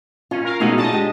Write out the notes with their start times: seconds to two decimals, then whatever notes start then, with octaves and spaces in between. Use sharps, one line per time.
0.31 C#4 F4
0.45 A#4 F5
0.60 B2 G#3 A3 C#4 D#4 F#4
0.78 D4 F4 G#4 D#5 A5
0.93 G#3 G4